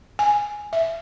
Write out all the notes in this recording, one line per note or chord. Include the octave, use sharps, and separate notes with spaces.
G#5
E5